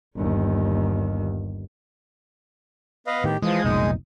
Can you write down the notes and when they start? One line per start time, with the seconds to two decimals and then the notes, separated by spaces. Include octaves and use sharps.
0.16 G1 D#2
3.07 B3 B4 D#5 F5
3.24 A2 D#3 G4
3.42 E3 F3 G#3 D#6
3.64 F1 B1 A#2 D#4